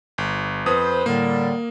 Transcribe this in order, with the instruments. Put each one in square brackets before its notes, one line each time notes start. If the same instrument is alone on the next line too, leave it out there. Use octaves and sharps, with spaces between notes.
[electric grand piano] G1
[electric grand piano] F2 D#6 [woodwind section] B4 C5
[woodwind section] A2 D3 G3 [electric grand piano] A#3